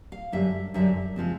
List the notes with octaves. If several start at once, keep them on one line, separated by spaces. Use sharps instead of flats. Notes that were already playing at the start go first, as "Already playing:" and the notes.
F5
F#2 D3 G3 E5
F#2 D3 G3 E5
C#3 F3 G#3 C4